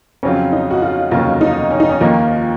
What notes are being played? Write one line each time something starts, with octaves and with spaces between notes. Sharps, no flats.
F2 C#3 F#3 C4 C#4 F4
D#4
F#4
F4
F1 D#2 C#3 F#3 F4
D#4
C#4
D#4
C#4
D#2 D#3 F3 A#3 F4